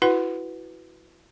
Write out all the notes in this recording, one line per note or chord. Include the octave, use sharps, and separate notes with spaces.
E4 F#4 B4 F#5